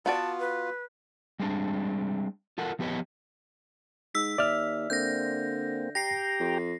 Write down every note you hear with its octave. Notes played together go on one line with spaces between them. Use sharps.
B3 F4 F#4 D5 A5
B4
G3 G#3 C4 D4
F4 A4 A#4 F#5
F3 B3 G4 B4 C#5 D#5
G#2 E6 B6
D#2 D5 E5 F6
D3 A#3 C4 G6 A#6
G4 G5 A#5 A#6 C7
F2